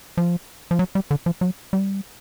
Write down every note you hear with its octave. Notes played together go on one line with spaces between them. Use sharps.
F3
F3
F#3
G3
D3
F3
F#3
G3